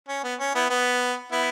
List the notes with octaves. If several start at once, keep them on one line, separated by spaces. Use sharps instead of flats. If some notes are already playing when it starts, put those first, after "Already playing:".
C#4
B3
C#4
B3 E4
B3
B3 E4